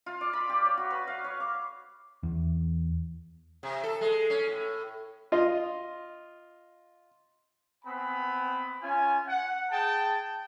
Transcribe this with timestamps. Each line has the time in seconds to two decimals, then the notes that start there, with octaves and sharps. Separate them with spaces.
0.06 F4
0.21 D5
0.33 B5
0.49 G4
0.65 C#5
0.78 F#4
0.90 B4
1.07 F5
1.24 C#5
1.40 D6
2.23 E2
3.63 C3
3.83 A4
4.01 G#3
4.30 C#4
4.47 A2
5.32 F4 D#5
7.85 B3 C4 G#5 B5
8.82 C#4 F4 G#5
9.27 F#5
9.72 G#4 G5 A5